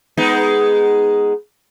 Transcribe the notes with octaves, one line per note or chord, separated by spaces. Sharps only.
G#3 B3 D#4